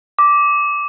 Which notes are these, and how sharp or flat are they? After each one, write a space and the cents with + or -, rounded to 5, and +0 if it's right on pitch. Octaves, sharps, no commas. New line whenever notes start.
D6 -10